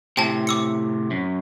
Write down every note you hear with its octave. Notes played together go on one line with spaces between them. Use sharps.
A2 C3 G5 A5
D6 E6 C#7
F#2